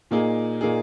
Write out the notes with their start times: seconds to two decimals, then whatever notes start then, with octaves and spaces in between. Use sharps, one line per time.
0.11 A#2 A#3 D#4 G#4
0.61 A#2 A#3 D#4 G#4